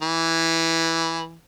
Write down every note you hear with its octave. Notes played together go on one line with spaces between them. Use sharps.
E3